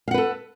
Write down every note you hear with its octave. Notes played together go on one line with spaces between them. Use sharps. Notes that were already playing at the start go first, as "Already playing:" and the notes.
A4 B4 F5 F#5